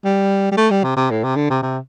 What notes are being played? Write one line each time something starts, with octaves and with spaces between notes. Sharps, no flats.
G3
G3
A3
G3
C3
C3
A2
C3
D3
C3
C3